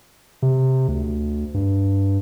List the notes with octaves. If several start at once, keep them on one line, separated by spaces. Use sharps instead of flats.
C3
D2
G2